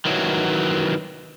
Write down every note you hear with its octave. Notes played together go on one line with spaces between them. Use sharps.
D#3 E3 F#3